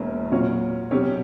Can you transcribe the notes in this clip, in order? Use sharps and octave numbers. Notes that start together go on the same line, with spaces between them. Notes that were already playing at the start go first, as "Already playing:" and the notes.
Already playing: E1 E2 B2 A#3 C#4
A#2 F#3 C#4 F#4 C#5
B2 F#3 C#4 G4 C#5